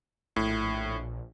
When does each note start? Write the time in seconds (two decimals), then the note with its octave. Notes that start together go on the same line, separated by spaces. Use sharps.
0.36 A#1 A2